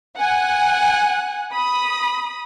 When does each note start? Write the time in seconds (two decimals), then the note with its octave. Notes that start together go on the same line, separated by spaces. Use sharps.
0.18 F#5 G#5 F#6
1.52 B5 D#6